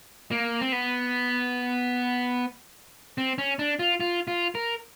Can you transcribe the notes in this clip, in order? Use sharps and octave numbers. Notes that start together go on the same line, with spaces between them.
A#3
C4
B3
C4
C#4
D4
F4
F4
F4
A#4